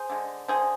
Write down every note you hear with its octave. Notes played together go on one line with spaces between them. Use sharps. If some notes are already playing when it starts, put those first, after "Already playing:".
Already playing: G#4 C5
D3 G#3
D3 G#3 G#4 C5